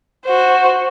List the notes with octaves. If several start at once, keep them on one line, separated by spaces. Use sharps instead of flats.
F#4 C5